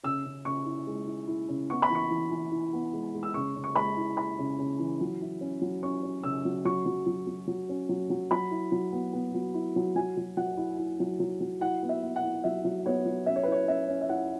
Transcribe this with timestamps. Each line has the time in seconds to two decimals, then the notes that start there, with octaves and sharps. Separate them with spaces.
0.04 C#3 E6
0.25 C#3
0.45 C#3 C#6
0.66 E4
0.87 G#3
1.07 E4
1.28 E4
1.49 C#3
1.70 B3 C#6
1.82 B5
1.90 E3 C#6
2.11 E3
2.31 E3
2.52 E4
2.73 B3
2.93 G#3
3.14 G#3
3.23 E6
3.34 C#3 C#6
3.55 C#3
3.64 C#6
3.76 G#3 B5
3.97 E4
4.17 E4 B5
4.39 C#3
4.59 C#3
4.79 E3
5.01 F#3
5.21 E4
5.41 C#4
5.61 F#3
5.83 C#4 C#6
6.03 C#4
6.23 C#3 E6
6.45 F#3
6.65 F#3 C#6
6.86 F#3
7.06 F#3
7.27 F#3
7.47 F#3
7.69 C#4
7.89 F#3
8.10 F#3
8.31 F#3 B5
8.51 E4
8.72 F#3
8.92 B3
9.13 B3
9.34 F#3
9.54 E4
9.76 F#3
9.96 F#3 G#5
10.17 F#3
10.37 F#3 F#5
10.57 E4
10.78 E4
11.00 F#3
11.20 F#3
11.41 F#3
11.61 E4 F#5
11.83 B3
11.89 E5
12.03 B3
12.16 F#5
12.23 E4
12.44 F#3 E5
12.65 F#3
12.86 B3 C#5
13.05 F#3
13.26 C#4 E5
13.36 C#5
13.43 E4 B4
13.52 C#5
13.68 C#4 E5
13.88 C#4
14.01 E5
14.09 E4 F#5